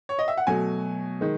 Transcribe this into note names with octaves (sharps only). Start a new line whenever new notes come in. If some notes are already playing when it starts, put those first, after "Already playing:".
C#5
D#5
E5
F#5
B2 F#3 A3 G#5
D#3 G#3